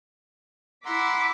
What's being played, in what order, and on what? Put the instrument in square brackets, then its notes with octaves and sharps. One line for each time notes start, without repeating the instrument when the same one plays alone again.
[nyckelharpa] E4 [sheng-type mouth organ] F#5 A#5 C6 [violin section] D6 B6